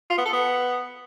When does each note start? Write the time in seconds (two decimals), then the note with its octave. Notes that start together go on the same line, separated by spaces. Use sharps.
0.10 F4
0.17 B3
0.25 A4
0.33 B3